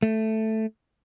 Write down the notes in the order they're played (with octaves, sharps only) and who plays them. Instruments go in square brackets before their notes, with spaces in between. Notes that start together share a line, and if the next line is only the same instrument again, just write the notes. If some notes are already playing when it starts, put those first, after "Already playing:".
[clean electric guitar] A3